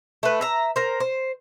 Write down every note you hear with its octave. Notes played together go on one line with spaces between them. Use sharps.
A3 B4
E5 A#5
A#4 C5
C5